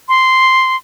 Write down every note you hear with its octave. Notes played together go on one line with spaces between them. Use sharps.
C6